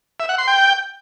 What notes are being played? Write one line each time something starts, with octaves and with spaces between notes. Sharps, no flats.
E5
F#5
C6
G5